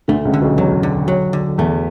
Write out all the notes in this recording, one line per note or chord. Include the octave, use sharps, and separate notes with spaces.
D2 D3 A3
C#2 C#3
D3
B1 B2
E2 F#3
D3
F#3
D3
E2 A3